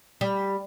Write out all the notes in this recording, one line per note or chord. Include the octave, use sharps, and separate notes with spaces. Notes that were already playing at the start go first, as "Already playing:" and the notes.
G3